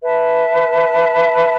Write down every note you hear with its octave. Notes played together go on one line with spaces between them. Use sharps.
B4 E5 A5